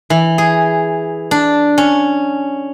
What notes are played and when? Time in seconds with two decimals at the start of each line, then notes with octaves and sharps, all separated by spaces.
0.10 E3
0.38 G#4
1.31 D4
1.78 C#4